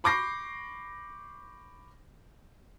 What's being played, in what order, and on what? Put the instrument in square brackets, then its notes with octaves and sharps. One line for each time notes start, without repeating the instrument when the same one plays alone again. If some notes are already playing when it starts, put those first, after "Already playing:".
[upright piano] B5 C#6 D6 G6 A#6 C7